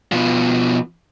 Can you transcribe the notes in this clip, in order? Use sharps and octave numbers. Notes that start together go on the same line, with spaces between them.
B2 F3